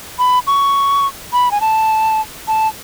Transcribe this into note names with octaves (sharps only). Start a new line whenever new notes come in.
B5
C#6
B5
G#5
A5
A5